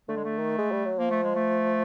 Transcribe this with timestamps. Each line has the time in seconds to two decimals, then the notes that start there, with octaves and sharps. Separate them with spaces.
0.08 D3 A3
0.16 G#3
0.24 A3
0.38 D#3
0.58 G#3
0.71 G3
0.85 F#3
0.98 F3 A#3
1.11 A3
1.23 G#3
1.35 A3